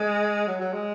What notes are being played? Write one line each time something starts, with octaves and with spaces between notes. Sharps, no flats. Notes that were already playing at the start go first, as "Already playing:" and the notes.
Already playing: G#3
F#3
F#3
G#3